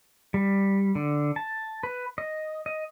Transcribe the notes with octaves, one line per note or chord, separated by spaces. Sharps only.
G3
D3
A5
B4
D#5
D#5